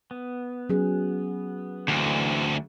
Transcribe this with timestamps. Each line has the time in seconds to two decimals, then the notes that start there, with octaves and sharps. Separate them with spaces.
0.11 B3
0.69 F#3 C#4 G#4
1.88 D2 D3 E3 C4 D4